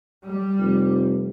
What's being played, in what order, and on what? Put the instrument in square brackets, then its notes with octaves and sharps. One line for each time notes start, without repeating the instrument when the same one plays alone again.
[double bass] G3
[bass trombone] F1